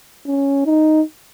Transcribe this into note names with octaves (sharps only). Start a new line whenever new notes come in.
C#4
D#4